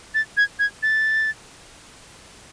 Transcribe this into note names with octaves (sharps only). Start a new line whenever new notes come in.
A6
G#6
G#6
A6